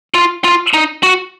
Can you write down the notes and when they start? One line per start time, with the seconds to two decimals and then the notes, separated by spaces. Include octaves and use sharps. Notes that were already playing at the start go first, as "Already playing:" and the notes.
0.14 F4
0.44 F4
0.74 D#4
1.03 F#4